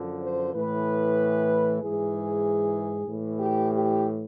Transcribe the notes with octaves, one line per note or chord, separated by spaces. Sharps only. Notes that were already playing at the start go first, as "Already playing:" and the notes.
Already playing: F#2 D3 F3
C5
A2 E3 B4
G#2 E3 G#4
A2 E3
G4
G4